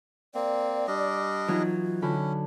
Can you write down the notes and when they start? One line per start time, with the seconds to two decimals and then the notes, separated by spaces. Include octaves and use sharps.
0.35 A#3 C4 D5
0.87 G3 D4 D#5
1.48 E3 F#3 D#4 F4
2.02 D3 C#4 B5